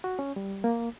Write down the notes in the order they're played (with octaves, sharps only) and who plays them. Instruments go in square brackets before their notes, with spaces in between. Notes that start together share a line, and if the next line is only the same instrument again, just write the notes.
[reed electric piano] F#4
C#4
G3
A#3